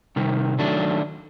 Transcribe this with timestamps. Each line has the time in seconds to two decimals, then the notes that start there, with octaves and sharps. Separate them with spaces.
0.16 C3 D#3 G3
0.59 D#3 F#3 A3 D4